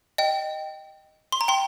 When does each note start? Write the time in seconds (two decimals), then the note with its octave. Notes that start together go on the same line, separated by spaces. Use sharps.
0.18 D#5 G5
1.32 C6
1.41 A#5
1.48 G5 C6